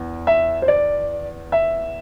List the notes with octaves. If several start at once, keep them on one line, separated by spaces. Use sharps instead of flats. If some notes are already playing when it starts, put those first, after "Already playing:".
Already playing: E2
E5
C5
D5
E5